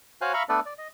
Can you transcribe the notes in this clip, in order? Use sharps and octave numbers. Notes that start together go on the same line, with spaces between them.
F#4 C5 C#5 F5 G#5 F#6
E5 F5 A#5 B5 C#6
A3 B3 D4 A4 B4 D5
D5
D#5